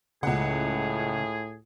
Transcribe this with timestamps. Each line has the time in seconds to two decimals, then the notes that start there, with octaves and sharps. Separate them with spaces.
0.23 C#2 A2 C#3 G#4 F#5